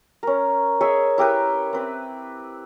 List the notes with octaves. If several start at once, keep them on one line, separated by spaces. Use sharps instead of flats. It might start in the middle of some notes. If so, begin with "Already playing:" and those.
C#4 A#4
G#4 C#5 D#5 E5
E4 G4 A#4 B4
C4 B4